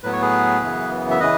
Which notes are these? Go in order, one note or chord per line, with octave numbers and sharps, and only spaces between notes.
A2 F#3 B3 B4
C#5
G#4 B4
F#2 C#3 E3 B3
E5
C#3 E3 B4 D#5